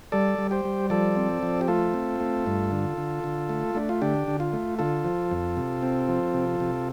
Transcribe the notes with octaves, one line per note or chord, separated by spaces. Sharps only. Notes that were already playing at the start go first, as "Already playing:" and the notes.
G3 A4 D5
G3
G4 C5
G3
F3 A4 D5
C4
F3
G4
A3 F4 A4
C4
A3
G2
D3
D3
D3
A3
A3 D4
F4
D3 D4 G4
D3
F4
A3
D3 F4 A4
F3
F2
C3
C4
F3
C3
C3